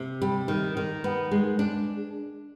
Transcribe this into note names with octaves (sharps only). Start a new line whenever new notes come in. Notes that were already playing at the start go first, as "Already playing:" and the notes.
Already playing: C3
G3
D#3
D#3
B3
G#3
D4